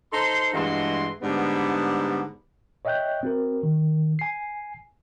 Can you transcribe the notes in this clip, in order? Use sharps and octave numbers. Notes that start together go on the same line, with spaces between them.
D#4 A4 C5 A#5 C6
G2 E3 G#3 A3 F#4 C6
G#2 D3 G3 B3
C#5 D#5 E5 G5 F#6 G6
C4 F#4 A#4
D#3
G#5 C7